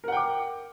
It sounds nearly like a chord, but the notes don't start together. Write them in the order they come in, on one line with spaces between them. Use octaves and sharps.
A#4 F#5 G5 D6